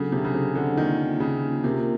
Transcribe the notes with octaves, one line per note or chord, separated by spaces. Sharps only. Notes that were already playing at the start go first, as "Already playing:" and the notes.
Already playing: C#3 F#3 B3 D4 F#4 A4
C3
C#3
C3
D3
D#3 A#3 D4 F4
C#3
C3 A#3 C#4 F4 A#4